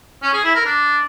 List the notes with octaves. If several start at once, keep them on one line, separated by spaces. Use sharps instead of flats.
C#4
G#4
E4
A#4
D4